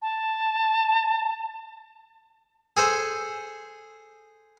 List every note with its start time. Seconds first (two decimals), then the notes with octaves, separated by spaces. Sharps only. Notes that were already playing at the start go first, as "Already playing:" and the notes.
0.02 A5
2.77 G#4 A4 C5